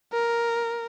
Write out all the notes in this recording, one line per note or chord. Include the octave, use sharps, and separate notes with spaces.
A#4